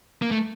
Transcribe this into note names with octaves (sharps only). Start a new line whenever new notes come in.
A#3
A3